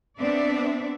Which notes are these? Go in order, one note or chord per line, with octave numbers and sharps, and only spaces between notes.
B3 C4 D4 D5 E5